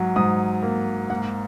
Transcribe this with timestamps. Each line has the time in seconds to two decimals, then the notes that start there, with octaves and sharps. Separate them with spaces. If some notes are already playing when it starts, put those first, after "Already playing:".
Already playing: G#2 F#3
0.16 G#2 D#6
0.63 A#3
1.10 A#3 F#5